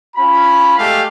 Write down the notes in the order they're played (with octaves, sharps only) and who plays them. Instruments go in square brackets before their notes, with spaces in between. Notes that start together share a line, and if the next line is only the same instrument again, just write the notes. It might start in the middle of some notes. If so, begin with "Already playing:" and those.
[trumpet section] C#4 F4 B5
G#3 A3 G4 F5